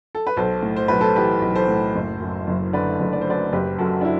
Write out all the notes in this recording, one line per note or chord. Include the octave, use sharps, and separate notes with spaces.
A4
B4
B1 A4 C5
A2
C5
B1 B4
A4 C5
E3 G4 B4
B1
A4 C5
A2
F#1
F#2
F#1
D3 B4 D5
F#1
D5
C5
F#2 B4 D5
F#1 G4 B4
F#2 F#4 A4
D4
E4